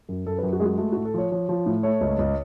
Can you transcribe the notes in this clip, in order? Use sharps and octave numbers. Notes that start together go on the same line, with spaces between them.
F#2
F#2 A4
B4
F#2
F#4
G#3 G#4
F#4
A3 F#4
A2 F#4
A4
F3 C#5
F3 C#5
F3
A2
A3 C#5
C#2
C#2